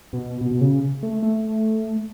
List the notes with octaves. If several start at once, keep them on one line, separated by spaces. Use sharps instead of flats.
B2
B2
B2
C#3
A3
A3